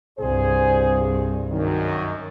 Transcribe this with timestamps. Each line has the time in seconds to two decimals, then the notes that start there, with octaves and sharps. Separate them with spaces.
0.19 C2 G2 G#4 C5
1.52 F#2 D#3